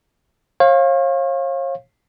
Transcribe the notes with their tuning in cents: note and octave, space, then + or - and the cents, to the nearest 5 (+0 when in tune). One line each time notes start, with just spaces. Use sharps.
C#5 -40 F5 +0